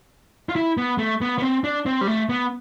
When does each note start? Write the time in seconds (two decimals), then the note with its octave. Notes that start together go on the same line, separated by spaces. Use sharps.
0.49 F4
0.56 E4
0.77 B3
0.98 A3
1.21 B3
1.38 B3
1.42 C4
1.64 D4
1.86 C4
2.01 G3
2.07 A3
2.29 B3